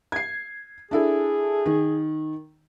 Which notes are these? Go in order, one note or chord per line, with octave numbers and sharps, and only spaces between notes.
G#6 C7
D4 E4 G#4 A4
D#3